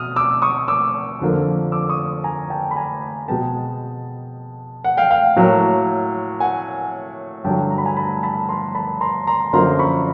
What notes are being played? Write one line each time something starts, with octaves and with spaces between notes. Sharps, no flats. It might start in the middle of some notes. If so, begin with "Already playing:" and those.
Already playing: B2 D#6 F6
D6 E6
C#6 D#6
D6 E6
F2 D3 F3 A#3
D6 E6
C#6 D#6
G#5 A#5
G5 A5
B5
G#5 A#5
B2 G#3 B3 G5 A5
F#5
F5 G5
F5 G5
A2 F#3 A#3
F#5 G#5
G2 D3 F#3 G5 A5
A#5
B5
G#5 A#5
A5 B5
A5 B5
A#5 C6
A5 B5
A#5 C6
A#5 C6
F#2 D3 F3 A#3 A#5 C6
B5 C#6